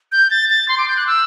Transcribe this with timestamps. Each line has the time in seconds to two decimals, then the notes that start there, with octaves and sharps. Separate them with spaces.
0.12 G6
0.30 A6
0.50 A6
0.69 C6
0.78 D6
0.88 G6
0.97 F#6
1.07 E6